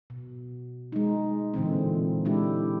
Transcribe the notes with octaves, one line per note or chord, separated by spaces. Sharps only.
B2
G#3 D#4
A#2 D3 E3 C4
G#3 D4 E4 G4